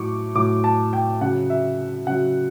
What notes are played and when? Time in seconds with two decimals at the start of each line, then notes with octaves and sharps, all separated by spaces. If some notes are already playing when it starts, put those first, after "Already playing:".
Already playing: A2 F#3 C#6 D6
0.35 A2 F#3 D6
0.64 A5
0.93 G5
1.21 C#3 F#3 F#5
1.50 E5
2.07 C#3 F#3 F#5